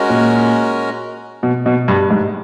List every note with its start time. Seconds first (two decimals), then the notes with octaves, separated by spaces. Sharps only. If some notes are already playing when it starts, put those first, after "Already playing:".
Already playing: G#3 C#4 F#4 A#4
0.10 A#2
1.43 B2
1.66 B2
1.88 G2
2.10 G#2